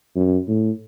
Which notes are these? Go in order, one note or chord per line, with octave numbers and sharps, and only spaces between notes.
F#2
A2